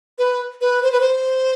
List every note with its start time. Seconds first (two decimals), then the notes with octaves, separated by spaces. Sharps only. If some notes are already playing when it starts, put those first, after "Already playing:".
0.18 B4
0.61 B4
0.83 C5
0.92 B4
1.01 C5